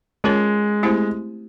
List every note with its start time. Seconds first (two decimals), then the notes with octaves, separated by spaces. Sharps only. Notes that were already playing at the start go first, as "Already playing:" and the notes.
0.24 G#3 C#4 F4 A#4 C#5
0.83 A3 C4 E4 G4 C5